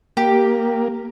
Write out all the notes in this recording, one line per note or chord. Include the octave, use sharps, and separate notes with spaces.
A#3 G4